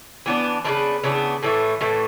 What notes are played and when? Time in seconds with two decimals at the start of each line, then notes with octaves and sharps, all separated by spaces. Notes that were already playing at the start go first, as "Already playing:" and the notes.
0.26 E3 B3 D4
0.64 C#3 E3 B3 D4 B4
1.04 C#3 E3 B3 D4
1.43 A2 E3 A3
1.81 A2 E3 A3